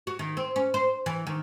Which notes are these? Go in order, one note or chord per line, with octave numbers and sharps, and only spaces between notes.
F#4
D#3
C4
C#4
C5
E3
D#3